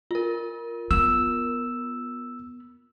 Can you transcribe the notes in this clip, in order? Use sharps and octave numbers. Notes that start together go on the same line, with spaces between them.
F4 A#4
B3 E6